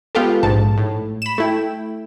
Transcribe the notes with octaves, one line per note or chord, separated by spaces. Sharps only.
G#3 B3 F4 G4 A4
A#1 G#2 A5
A2
B5 E7
A3 E4 G5